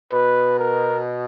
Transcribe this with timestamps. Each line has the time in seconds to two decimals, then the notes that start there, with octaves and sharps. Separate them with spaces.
0.12 B2 B4
0.59 A#4